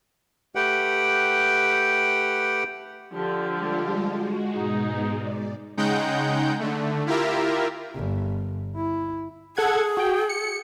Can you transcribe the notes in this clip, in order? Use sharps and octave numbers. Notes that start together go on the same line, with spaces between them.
A3 G4 B4 F#5 G5
D3 F3 G4
G3 G#3 F4
G#3 F#4
G#2 B2 G#3 D#4
D5
C#3 G#3 D#4 F#5 G5 G6
D3 A3
E4 F4 G4 A#4 E5
G1
E4
G#4 A4 F#5 G#6
F#4 G5
C#7